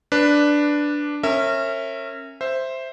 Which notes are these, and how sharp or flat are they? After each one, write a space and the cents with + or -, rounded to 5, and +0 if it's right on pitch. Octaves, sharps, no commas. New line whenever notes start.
D4 +0 B4 +0
C#4 -25 A#4 -25 E5 +0
C5 +0 E5 +0